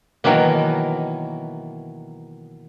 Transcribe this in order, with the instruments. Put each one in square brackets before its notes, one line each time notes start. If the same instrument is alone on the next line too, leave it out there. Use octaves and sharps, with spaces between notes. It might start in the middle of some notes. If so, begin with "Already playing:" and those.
[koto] B2 D#3 E3 F#3 A#3